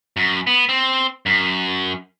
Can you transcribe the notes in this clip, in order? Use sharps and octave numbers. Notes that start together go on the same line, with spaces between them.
F#2
B3
C4
F#2